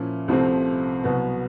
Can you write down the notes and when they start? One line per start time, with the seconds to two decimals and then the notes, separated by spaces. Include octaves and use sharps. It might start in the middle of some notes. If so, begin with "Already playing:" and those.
Already playing: A#2 F3 A#3 C#4 E4
0.28 C2 C3 F3 A3 C4
1.03 C2 B2 F#3 B3